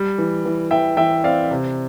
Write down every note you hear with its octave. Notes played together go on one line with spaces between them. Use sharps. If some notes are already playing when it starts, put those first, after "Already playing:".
Already playing: G3
E3
E3
E3 E5 G5
E3 E5 G5
C4 D5 F5
C3